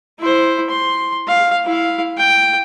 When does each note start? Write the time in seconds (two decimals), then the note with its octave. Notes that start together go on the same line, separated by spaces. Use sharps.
0.19 E4 C5
0.70 C6
1.27 F5
1.65 E4 F5
2.17 G5